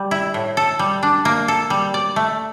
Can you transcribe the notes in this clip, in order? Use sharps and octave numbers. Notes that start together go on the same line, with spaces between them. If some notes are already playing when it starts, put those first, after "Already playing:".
Already playing: G3
E4
A2
A4
G3
D4
A#3
A4
G3
D5
A3